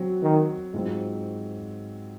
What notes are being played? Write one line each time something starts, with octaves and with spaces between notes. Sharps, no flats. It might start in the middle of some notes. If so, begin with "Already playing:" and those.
Already playing: F#3 C4 F#4
D#3
G#2 F#3 C4 F4